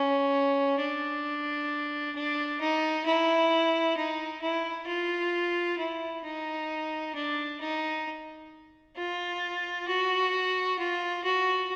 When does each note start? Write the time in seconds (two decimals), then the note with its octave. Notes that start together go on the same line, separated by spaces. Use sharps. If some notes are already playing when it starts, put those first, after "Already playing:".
Already playing: C#4
0.79 D4
2.15 D4
2.60 D#4
3.06 E4
3.97 D#4
4.42 E4
4.87 F4
5.78 E4
6.24 D#4
7.15 D4
7.60 D#4
8.97 F4
9.88 F#4
10.79 F4
11.24 F#4